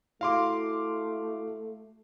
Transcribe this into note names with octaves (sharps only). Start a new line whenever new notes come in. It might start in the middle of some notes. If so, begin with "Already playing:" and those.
A3 E4 F#4 F5 C6 D6